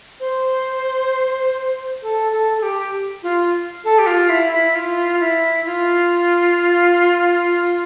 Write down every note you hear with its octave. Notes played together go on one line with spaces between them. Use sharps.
C5
A4
A4
A4
G4
F4
A4
G4
F4
E4
E4
F4
E4
F4